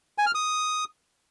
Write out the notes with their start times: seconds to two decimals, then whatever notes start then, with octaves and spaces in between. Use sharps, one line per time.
0.18 G#5
0.26 F6
0.35 D#6